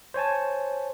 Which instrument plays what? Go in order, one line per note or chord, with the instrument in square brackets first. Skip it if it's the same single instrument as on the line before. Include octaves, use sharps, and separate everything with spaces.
[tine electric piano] C5 C#5 G#5 A5